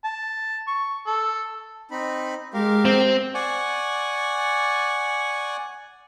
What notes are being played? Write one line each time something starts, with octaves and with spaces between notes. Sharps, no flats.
A5
C#6
A4
C4 D#4 B5
G#3 G4 A#4 F5
C4
D5 F#5 G#5 C#6